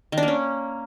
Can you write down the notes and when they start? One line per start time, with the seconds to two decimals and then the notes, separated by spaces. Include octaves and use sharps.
0.12 D#3
0.18 D4
0.23 A#3
0.28 C#4